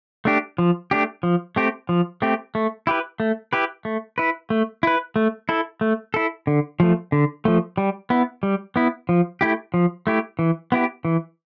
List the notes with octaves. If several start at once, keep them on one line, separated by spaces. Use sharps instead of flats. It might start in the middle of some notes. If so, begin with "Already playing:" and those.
A3 D4 G4
F3
A3 D4 G4
F3
A3 C4 G4
F3
A3 C4 G4
A3
E4 G4 B4
A3
E4 G4 B4
A3
E4 B4
A3
E4 B4
A3
E4 A4
A3
E4 A4
D3
F3 A3
D3
F3 A3
G3
B3 E4
G3
B3 E4
F3
A3 E4 G4
F3
A3 E4 G4
E3
B3 E4 G4
E3